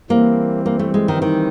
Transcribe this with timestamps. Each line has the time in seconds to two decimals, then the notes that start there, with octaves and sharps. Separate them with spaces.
0.10 E3 G3 A#3 C4
0.66 A#3
0.79 A3
0.94 G#3
1.08 D#3
1.22 D#3